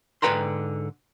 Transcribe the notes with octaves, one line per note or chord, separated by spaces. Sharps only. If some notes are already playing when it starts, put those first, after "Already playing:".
G#2 D3 B4 G5 A#5 C6